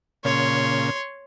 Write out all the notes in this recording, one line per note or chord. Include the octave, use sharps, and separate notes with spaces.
A#2 C#3 C#5 C6